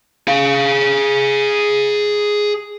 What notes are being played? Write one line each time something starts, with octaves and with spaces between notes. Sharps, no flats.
G#4 F5